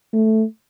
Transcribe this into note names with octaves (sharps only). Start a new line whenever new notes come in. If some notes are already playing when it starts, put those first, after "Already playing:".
A3